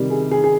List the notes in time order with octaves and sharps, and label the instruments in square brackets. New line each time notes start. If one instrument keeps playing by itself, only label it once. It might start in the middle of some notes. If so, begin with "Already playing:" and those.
Already playing: [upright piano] C3 D#3 G3
G#4
G#4
G#4